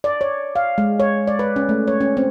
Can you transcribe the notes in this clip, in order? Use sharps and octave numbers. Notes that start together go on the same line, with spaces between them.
D5
C#5
F5
G#3
C#5
D5
B4
C#4
A3
C#5
C#4
C4